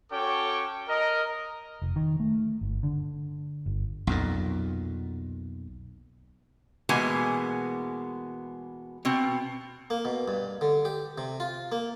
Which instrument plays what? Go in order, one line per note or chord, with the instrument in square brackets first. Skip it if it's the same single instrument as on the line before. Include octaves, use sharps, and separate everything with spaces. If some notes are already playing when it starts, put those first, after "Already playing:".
[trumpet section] C#4 F#4 A4 C#5 G5 D6
A#4 D#5
[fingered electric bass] F1
D#3
A3
G1
D3
G1
[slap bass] B1 F2 A#2
[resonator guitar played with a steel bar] B2 E3 G#3 A#3 B3 G#5
B2 C4
[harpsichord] A#3
B2
G2
D3
G4
C3
F4
A#3